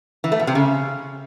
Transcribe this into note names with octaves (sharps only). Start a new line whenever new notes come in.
E3
A3
B2
C3
C#3